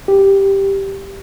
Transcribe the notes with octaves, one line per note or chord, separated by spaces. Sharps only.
G4